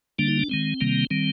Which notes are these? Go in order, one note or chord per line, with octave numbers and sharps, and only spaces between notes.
D3 G3 A#3 D4
D#4
D4
D#3 G#3 C4
C3 D#3 G3 A#3
D#3 G3 C4